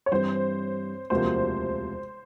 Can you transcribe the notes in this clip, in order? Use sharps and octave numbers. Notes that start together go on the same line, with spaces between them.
C#5
G2 E3 G3 C4 C5
E1 D2 C3 F3 A#3 C5